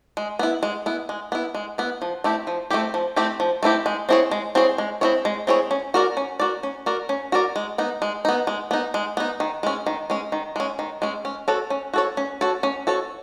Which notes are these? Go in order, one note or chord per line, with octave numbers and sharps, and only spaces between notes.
G#3
B3 E4
G#3
B3 E4
G#3
B3 E4
G#3
B3 E4
F3
A3 C4 E4 G4
F3
A3 C4 E4 G4
F3
A3 C4 E4 G4
F3
A3 C4 E4 G4
G#3
C4 E4 G#4 C#5
G#3
C4 E4 G#4 C#5
G#3
C4 E4 G#4 C#5
G#3
C4 E4 G#4 C#5
C#4
F#4 A#4 D5
C#4
F#4 A#4 D5
C#4
F#4 A#4 D5
C#4
F#4 A#4 D5
G#3
B3 D#4
G#3
B3 D#4
G#3
B3 D#4
G#3
B3 D#4
D#3
G#3 C#4
D#3
G#3 C#4
D#3
G#3 C#4
D#3
G#3 C#4
C#4
F#4 A4 C#5
C#4
F#4 A4 C#5
C#4
F#4 A4 C#5
C#4
F#4 A4 C#5